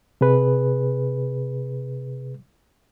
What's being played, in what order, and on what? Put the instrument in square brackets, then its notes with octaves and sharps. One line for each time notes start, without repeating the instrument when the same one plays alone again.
[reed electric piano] C3 G#4 B4